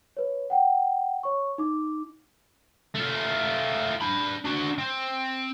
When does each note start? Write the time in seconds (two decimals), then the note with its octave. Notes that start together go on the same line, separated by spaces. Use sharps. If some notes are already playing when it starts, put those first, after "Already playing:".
0.17 B4 C#5
0.50 F#5 G5
1.23 C#5 C#6
1.58 D#4 D6
2.95 A3 F4
4.01 D4 B5
4.45 D4 F#4
4.78 C4